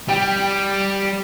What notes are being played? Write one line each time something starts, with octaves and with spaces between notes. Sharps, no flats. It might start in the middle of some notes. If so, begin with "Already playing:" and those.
G3 G5